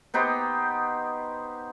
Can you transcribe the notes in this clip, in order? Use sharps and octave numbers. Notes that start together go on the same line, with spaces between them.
B3 D#4 G4 C5